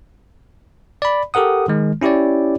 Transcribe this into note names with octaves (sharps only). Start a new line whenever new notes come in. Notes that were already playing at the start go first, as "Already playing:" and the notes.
D5 B5
G4 A4 A#4 F#5 D#6
D#3 G#3
C#4 E4 G4 C#5 D5